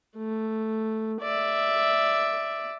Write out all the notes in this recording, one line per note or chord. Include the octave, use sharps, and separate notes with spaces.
A3
D5 E5